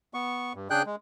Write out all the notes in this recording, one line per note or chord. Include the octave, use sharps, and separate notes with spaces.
B3 C#6
G2
C#3 D4 G#4 G5 F#6 G6
G#3